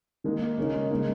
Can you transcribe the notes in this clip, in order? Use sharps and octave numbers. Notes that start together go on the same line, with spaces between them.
D#3 G#3 A#3 D#4
A#3
C#3 A#3 C#4 D#4
G#3
C#3 G#3 A#3 D#4